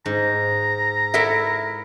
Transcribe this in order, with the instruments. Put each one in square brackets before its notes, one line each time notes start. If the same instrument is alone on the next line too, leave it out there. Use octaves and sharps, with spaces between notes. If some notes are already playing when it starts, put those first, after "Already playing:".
[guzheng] G#2 [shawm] A#5
[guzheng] E4 [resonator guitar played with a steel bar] A4 A#4 E5